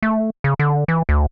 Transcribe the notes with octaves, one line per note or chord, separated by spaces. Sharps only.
A3
C#3
D3
E3
D2